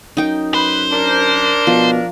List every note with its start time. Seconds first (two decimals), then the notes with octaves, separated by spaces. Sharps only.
0.17 F#2 D#4 G5
0.54 B4 C5
0.91 D4 A#4
1.67 B2 F3